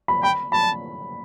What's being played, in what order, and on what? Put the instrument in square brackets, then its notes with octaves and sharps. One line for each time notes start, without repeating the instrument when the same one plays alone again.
[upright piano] B5
[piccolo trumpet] G5 [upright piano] B5
[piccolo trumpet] A5 [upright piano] B5